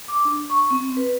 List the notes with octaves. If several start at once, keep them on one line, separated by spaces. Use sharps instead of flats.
D6
D4
C#6
C4
B4